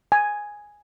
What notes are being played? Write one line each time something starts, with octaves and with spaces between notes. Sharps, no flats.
G#5